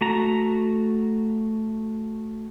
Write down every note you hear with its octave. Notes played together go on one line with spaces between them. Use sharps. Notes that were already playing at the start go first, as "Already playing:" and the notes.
A3 F#4 A#5